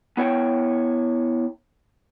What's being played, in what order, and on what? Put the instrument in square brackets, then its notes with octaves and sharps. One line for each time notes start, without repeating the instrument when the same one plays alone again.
[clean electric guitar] B3 E4 C#5 G5